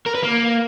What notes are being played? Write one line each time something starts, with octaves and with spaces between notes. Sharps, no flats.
A#4
B4
A#3